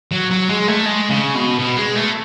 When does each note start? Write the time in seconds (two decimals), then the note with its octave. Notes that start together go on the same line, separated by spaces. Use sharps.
0.11 F#3
0.31 F#3
0.49 G#3
0.68 A3
0.86 G#3
1.09 C#3
1.34 B2
1.59 B2
1.77 G#3
1.95 A3